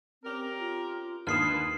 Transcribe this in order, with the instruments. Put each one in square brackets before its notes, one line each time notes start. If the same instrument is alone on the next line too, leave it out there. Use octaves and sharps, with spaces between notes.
[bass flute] C4 [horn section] C#4 G4 A#4
[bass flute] F4
[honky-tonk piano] D#2 D#6 [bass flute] D4 [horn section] B4 [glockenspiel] F6 C7 E7